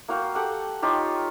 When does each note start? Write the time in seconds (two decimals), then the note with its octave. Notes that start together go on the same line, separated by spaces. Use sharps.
0.08 A#3 F#4 F5 G5
0.35 G4 A4 F#5 G5
0.82 D#4 F4 G4 C#5